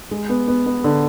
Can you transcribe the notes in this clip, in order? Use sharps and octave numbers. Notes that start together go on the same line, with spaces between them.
G#3
B3
B3
B3
D3